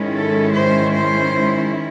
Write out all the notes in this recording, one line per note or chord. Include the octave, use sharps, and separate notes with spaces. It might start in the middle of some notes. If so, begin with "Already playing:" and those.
Already playing: G#2 D#3 G#3 C#4 E4
A4
C5
C5